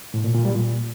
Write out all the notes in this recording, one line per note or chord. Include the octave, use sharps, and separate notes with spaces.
A2
A#2
A#2
G3
A#2